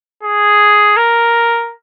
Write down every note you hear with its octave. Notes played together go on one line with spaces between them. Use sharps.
G#4
A#4